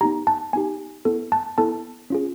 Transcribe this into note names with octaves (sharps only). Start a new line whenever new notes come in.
B3 D#4 G4 A#5
A5
B3 D#4 G4 G#5
B3 E4 A4
A5
B3 E4 A4 A5
C#4 F4 G#4